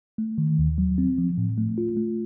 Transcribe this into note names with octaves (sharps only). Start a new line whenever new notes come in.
A3
D#3
D#2
F#3
C4
F3
A2
A3
F4
A3